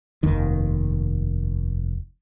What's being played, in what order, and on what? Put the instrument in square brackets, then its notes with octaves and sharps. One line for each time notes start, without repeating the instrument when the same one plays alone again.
[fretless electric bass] F1 D#2 D#3